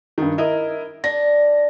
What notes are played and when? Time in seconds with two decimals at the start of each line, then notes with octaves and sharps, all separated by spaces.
0.18 G2 D#3
0.38 E4 A#4 D#5
1.04 D4 A#6